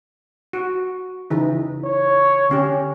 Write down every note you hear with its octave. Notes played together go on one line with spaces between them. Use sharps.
F#4
C#3 E3 D#4
C#5
D3 C#4 G4